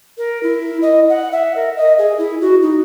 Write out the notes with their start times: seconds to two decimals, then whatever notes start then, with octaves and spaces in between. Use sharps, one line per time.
0.18 A#4
0.43 E4
0.82 D#5
1.09 F#5
1.32 E5
1.56 A#4
1.77 D#5
1.98 G#4
2.18 E4
2.41 F#4
2.62 D#4